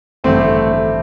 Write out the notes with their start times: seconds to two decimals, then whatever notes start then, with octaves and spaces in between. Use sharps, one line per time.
0.24 A1 G2 D3 A3 C4
0.40 A3
0.57 A3
0.72 A3